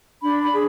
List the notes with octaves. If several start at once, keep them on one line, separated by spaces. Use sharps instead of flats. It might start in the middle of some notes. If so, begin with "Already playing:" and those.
D4 B5
B5
G#4